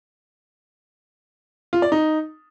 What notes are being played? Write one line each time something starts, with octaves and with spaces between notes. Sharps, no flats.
F4
D5
D#4